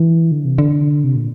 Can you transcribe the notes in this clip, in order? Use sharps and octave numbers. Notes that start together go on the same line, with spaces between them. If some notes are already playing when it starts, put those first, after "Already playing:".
Already playing: E3
D3
C3
D3
C3
A#2